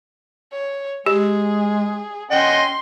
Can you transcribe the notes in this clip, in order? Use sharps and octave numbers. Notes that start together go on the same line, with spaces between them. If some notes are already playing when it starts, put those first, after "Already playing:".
C#5
G#3 G4 G#4
C#4 D#5 F#5 G5 C6